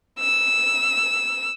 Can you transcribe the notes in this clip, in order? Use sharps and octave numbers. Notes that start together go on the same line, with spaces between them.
E6